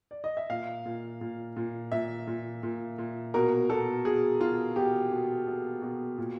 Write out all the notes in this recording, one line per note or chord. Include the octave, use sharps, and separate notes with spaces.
D5
D#5
E5
A#2 F5
A#2
A#2
A#2
A#2 E5
A#2
A#2
A#2
B2 A#4
B2 A4
B2 G#4
B2 F4
B2 G4
B2
B2
B2
A#2